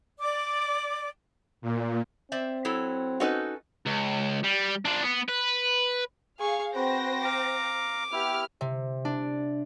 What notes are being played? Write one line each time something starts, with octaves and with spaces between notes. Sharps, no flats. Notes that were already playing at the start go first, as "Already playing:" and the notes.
D5 D6
A#2
C4 C5 D5 E5
F#3 E4 A4
C#4 D#4 F#4 A4 B4
C#2
G3
D4 F4
B3
B4
G#4 F5 C#6
C4 F#4 B4 C5 G5 A#6
F5 A#5 D6
B3 E4 G4 F6
C3
D4